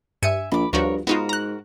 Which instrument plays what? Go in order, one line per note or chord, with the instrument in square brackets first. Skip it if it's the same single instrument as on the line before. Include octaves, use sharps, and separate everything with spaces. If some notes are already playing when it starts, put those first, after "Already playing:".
[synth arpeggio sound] G2 C#7 D#7 [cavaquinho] E5 G#5
[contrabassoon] A#1 [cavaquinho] B5 D6
[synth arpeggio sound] D2 F3 F#4 [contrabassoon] G2 [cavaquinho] A#4 C#5
[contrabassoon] G#2 [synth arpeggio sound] B3 D#4 F4 [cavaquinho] F#4 G#4 A#4
[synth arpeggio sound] A#5 F#6